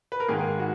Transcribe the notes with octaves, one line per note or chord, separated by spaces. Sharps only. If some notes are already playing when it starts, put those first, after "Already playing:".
B4
A#4
G#2 D#3 A#3 G#4
F#4